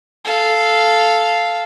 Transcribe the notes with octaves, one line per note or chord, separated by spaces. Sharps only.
A4 F5